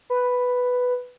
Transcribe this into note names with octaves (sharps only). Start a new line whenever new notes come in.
B4